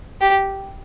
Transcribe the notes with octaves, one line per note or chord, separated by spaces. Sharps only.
G4